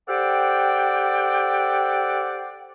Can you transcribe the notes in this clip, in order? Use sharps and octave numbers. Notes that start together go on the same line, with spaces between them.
G4 A4 C5 D5 F#5 G5